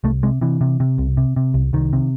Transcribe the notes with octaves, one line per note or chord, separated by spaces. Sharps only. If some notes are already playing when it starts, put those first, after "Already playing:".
C2 A3
C3 G#3
C3 E3
C3
C3
C2
C3
C3
C2
C2 D#3
C3